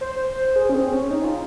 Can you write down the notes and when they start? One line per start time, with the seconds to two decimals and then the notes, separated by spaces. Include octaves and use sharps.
0.01 C5
0.56 G#4
0.70 C#4
0.74 C4
0.92 C#4
1.11 D#4
1.24 F4